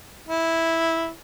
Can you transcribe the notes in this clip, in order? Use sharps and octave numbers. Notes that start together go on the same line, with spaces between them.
E4